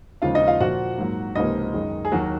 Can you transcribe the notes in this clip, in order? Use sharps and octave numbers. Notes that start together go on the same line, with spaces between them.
D#2 C#3 F3 G#3 F4 F5
D#4 D#5
F4 F5
A#2 F3 A#3 F#4 F#5
G#2 F#3 A#3
C#2 C3 F3 A#3 D#4 D#5
F#2 D#3 G#3
G#4
D#2 D#3 F#3 F#4